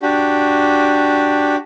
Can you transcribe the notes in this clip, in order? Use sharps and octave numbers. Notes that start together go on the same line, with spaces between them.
D4 F#4 G4